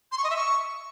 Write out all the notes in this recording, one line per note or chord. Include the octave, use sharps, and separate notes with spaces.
C6
C#6
D#5
E5
C#6